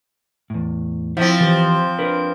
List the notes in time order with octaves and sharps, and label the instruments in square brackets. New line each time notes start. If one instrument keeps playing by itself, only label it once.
[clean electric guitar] E2 A2
[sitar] F3 C4 [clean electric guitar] E4 E5
[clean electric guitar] E3 G4
D4 A#4 B4